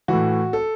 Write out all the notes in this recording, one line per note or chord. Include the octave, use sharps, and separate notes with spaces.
A2 E3 F#4
A4